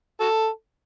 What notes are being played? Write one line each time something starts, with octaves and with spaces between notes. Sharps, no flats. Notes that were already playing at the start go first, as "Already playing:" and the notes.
F#4 A4